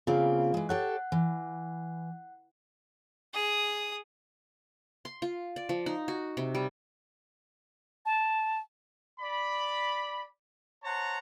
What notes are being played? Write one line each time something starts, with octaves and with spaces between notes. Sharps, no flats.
C#3 A#3 C4 F4 G#4 F5
E3 G#3
G4 A4 C#5 F#5 F#6
E3
G#4 D#6
C6
F4
D5
F3
D#4
F#4
C3
G3
A5
D5 B5
C5 C#5 F#5 A5 A#5